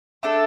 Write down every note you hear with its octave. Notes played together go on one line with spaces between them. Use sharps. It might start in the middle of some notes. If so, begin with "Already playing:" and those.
A3 D4 A4